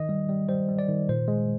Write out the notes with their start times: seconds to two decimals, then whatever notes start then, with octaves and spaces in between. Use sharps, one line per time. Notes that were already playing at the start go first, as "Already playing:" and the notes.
Already playing: D#3 D#5
0.09 G3
0.29 G3
0.49 G3 C5
0.69 G3
0.79 D5
0.89 D#3
1.09 A#2 C5
1.28 G#3